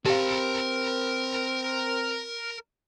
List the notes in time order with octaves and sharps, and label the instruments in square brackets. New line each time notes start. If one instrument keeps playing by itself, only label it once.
[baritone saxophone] C4 [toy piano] G4 F5 [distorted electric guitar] A#4 A5